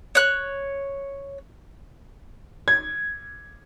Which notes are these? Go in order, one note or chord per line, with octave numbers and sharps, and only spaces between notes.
C#5 F#6
G#6